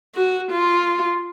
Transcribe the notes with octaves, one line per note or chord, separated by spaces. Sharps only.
F#4
F4